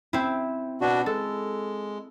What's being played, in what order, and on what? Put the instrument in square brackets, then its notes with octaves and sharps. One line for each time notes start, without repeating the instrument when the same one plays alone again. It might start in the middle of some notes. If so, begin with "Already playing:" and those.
[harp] C4 E4
[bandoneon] B2 D4 F#4
[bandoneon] G#3 [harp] A4